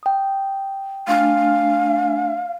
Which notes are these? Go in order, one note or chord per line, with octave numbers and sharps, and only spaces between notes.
G5 D#6
A3 D4 F5 G#5